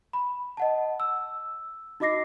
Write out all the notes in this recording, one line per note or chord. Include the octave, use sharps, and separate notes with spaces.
B5
D#5 F#5 A5
E6
D#4 F#4 D#5 D6 A#6 C7